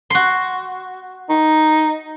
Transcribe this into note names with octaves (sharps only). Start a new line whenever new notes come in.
F#4 C6
D#4